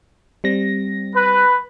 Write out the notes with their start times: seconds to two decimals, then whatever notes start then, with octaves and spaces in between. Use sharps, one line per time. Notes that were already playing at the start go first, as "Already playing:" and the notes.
0.44 G3 C4 A#6
1.14 B4